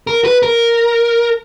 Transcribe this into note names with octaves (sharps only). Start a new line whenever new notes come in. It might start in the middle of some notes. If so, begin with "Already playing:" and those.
A#4
B4
A#4